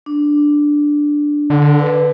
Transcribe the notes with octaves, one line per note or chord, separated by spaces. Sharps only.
D4
D3
B4